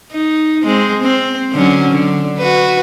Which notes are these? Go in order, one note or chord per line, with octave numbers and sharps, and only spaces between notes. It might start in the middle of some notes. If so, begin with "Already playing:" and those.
D#4
G#3 C4
C4
D3 F#3 C#4
D3
F#4 B4